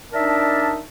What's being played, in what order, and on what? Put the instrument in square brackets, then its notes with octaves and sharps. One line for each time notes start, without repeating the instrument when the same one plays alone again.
[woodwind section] D4 D#4 A#4 D5 E5 A5